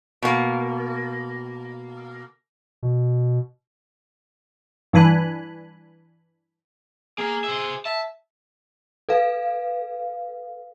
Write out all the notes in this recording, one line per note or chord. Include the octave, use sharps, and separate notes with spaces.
B2 A#3
B2
G2 E3 D4 G#5 B5 F#6
A#3 G#4 A#4
C5 E5
E5 A5
A4 B4 F5